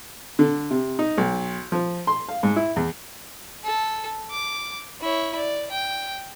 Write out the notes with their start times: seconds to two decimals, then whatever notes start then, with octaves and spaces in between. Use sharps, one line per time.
0.39 D3
0.71 C3
0.99 D#4
1.18 B1
1.72 F3
2.07 C6
2.29 F5
2.43 G#2
2.56 E4
2.76 E2
3.64 A4
4.31 D6
5.01 E4 C#5
5.36 D5
5.71 G5